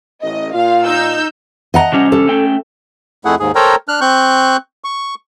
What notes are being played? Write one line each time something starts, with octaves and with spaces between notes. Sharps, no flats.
A1 D#5
A#2 F4 F5
D#4 E6 G6
D#5 F#5 A#5
C3 G3 C#4
A4
A3 C#4 G5
F2 A3 E4 G#4 F#5
D#2 G#2 G#4
A4 A#4 C5 C#5 G5 A#5
D4 F6 F#6
C4 C#6 F#6 G6
C#6